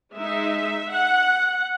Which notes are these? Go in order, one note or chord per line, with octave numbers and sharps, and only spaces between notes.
G#3 D#4 E5
F#5